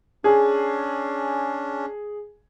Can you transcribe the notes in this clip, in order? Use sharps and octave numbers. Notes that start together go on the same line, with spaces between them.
C#4 D4 G#4